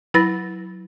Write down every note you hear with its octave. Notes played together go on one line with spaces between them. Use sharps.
F#3 E4 B4 B5 A6 A#6